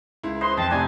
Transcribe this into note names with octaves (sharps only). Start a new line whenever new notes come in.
C#2 E4
B4 C5 D#5 C6
F2 D#5 A5
A2 C3 D4 D#5 G#5 A#5